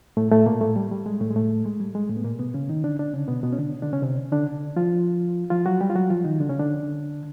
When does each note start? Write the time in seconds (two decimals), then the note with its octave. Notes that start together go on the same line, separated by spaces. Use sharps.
0.17 A2 A3
0.31 A2 A3
0.46 A#2 A#3
0.61 A2 A3
0.76 G3
0.92 G3
1.06 G#3
1.21 A2 A3
1.31 G#3
1.35 A2 A3
1.66 G#3
1.80 G3
1.95 G#3
2.10 A2 A3
2.17 B3
2.25 A#2 A#3
2.39 B2 B3
2.54 C#3 C#4
2.69 D#3 D#4
2.84 D3 D4
2.99 D3 D4
3.13 C#3 C#4
3.28 B2 B3
3.43 B2 B3
3.53 C#4
3.58 D3 D4
3.82 D3 D4
3.93 C#3 C#4
4.02 C3 C4
4.32 D3 D4
4.76 F3 F4
5.50 F3 F4
5.66 F#3 F#4
5.81 G3 G4
5.90 F4
5.96 F#3 F#4
6.10 F3 F4
6.24 D#3 D#4
6.40 D3 D4
6.49 C#3 C#4
6.59 D3 D4